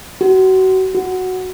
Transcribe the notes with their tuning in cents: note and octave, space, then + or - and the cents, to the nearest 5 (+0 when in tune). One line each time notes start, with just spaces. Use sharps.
F#4 +30
F#4 +0